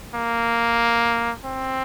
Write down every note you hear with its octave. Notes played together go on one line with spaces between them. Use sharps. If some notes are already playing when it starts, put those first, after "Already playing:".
A#3
C4